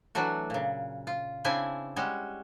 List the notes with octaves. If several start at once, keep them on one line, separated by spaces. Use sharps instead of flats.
E3 F#3 A3 D4 F#4
A#2 C#3
F4
C#3 C4 D4 E4 E5 G#5
G3 G#3 C#4 F#4